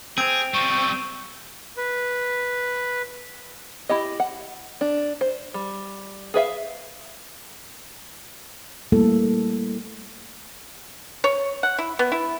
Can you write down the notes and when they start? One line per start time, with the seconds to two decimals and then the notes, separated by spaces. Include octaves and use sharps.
0.18 C4 G#4 D7 F7
0.54 G3 F4 C#6 D#7 E7
1.77 B4
3.89 E4 G4 D#5
4.20 F#5
4.81 D4
5.21 C5
5.54 G3
6.34 G#4 B4 E5 F5
8.92 G3 A3 A#3 E4 A4
11.24 C#5
11.63 F#5
11.78 E4
11.99 B3
12.12 E4